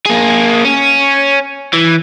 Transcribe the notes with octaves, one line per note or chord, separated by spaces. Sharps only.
A#3 G#4
C#4
E3